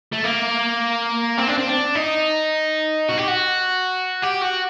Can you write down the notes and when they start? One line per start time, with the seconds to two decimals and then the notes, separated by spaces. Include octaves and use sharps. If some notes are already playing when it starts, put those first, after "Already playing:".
0.13 A3
0.24 A#3
1.38 C4
1.48 D4
1.58 C4
1.67 D4
1.95 D#4
3.09 F#4
3.18 G4
3.28 F#4
4.23 G4
4.42 F#4